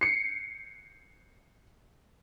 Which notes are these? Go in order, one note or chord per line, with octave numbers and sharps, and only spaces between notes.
C7 C#7